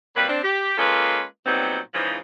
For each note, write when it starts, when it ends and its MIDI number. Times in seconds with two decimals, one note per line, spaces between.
0.16 0.29 48
0.16 0.29 54
0.16 0.29 55
0.16 0.29 58
0.16 0.29 71
0.29 0.42 60
0.29 0.42 62
0.44 0.78 67
0.78 1.24 56
0.78 1.24 58
0.78 1.24 61
0.78 1.24 65
0.78 1.24 69
0.78 1.24 71
1.46 1.80 46
1.46 1.80 54
1.46 1.80 55
1.46 1.80 59
1.46 1.80 60
1.46 1.80 63
1.94 2.17 44
1.94 2.17 49
1.94 2.17 52
1.94 2.17 53